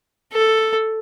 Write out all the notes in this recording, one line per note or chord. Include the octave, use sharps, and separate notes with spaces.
A4